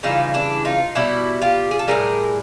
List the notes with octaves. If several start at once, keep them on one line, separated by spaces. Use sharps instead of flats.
C#3 E3 G3 D#4 F4
D4 E4
D#4 F4
B2 G3 E4 F#4
F4 G4
G#4
A4
A2 E3 G3 G#4 A#4